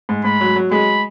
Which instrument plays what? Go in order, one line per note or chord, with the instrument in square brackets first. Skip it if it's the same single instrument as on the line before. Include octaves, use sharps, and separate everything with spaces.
[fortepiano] G#2
[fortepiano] G#2 [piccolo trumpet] B5
[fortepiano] F#3
F#3
[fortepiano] G#3 [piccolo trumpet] B5